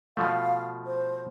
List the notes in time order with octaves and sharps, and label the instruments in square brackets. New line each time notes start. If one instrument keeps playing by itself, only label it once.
[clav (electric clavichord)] B2 F3 A3 [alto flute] F5
[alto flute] C5